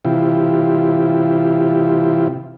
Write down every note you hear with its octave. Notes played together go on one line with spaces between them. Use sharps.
C3 E3 E4 F4 G4